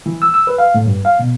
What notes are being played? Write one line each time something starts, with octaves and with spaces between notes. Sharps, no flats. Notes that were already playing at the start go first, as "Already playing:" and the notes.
E3
E6
E6
B4
F5
A2
G2
F5
B2